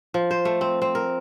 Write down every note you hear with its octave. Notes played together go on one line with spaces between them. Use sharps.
F3
C5
A3
C4
C4
A#4